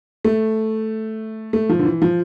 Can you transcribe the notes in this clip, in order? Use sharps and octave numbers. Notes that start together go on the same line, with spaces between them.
A3
A3
F3
D3
E3
F3